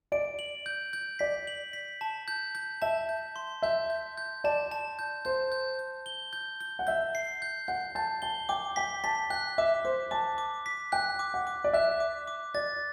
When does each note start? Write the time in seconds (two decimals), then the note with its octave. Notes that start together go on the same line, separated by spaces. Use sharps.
0.12 D5 D7
0.39 F#7
0.66 G6
0.93 G6
1.19 D5 B6
1.47 F#7
1.73 B6
2.01 A5
2.28 G6
2.55 G6
2.82 E5 A5
3.09 G6
3.36 C6
3.62 E5 G6
3.90 G6
4.18 G6
4.44 D5 A5
4.71 A5
4.99 G6
5.25 C5 G6
5.52 G6
5.79 G6
6.06 G7
6.33 G6
6.60 G6
6.79 F#5
6.87 E5 G6
7.15 C7
7.42 G6
7.68 F#5 G6
7.95 A5 G6
8.22 A5 G7
8.49 G5 D6
8.76 G5 B6
9.04 A5 B6
9.30 G5 F#6
9.58 E5 D6
9.85 C5 D6
10.11 A5 D6
10.38 D6
10.66 B6
10.92 G5 F#6
11.19 D6
11.34 F#5
11.47 D6
11.64 D5
11.73 E5 F#6
12.00 D6
12.27 D6
12.54 D5 A6